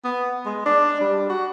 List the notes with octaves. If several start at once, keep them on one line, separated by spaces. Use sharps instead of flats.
B3
G#3
D4
G3
F#4